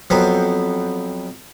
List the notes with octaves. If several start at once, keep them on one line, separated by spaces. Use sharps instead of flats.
F2 F#3 B3 C4